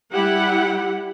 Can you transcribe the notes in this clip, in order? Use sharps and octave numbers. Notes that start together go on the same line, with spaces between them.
G3 E4 G4 F#5